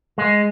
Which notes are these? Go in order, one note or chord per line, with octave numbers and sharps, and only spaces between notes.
G#3